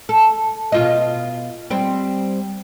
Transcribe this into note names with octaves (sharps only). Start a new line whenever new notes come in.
A4
B2 F4 D#5
G3 C4